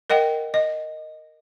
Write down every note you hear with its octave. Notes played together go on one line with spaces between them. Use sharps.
A#4 D#5 F#5 G5
D#5